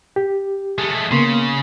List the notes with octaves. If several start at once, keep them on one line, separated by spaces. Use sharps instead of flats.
G4
G#3 A3
C#3 A#3 B3 C6